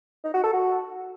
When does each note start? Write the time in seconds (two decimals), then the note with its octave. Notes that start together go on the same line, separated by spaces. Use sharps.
0.24 D#4
0.34 F#4
0.43 A4
0.53 F#4